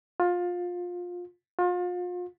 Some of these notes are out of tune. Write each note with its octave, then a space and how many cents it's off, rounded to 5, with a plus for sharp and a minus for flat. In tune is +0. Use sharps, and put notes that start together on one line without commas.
F4 +20
F4 +35